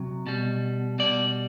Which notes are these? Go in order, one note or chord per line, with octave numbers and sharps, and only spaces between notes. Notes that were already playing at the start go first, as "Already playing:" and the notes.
Already playing: C3 F#3
B2 G3
B2 G3 D5